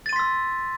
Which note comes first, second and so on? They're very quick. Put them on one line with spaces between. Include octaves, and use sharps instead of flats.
A6 D#7 C6 B6 E6